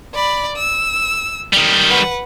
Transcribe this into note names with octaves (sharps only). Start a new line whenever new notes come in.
D5 B5
E6
D#3 G3
B4 F#5